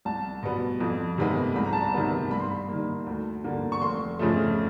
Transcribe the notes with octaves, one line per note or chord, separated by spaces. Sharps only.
C2 A5
B2 G3 B3
F2
C3 D#3 G#3 B3
C2 B5
A#5
A5
A#5
C3 D#3 G3 B3
G2 B5
C6
B5
D#3 G3 A#3
D2
D3 G3 A#3
C#6
F1 C6
F2 C#3 F3 A3